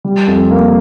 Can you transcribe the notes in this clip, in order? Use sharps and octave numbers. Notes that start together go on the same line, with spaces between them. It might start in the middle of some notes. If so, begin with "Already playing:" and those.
G3
F2
A#3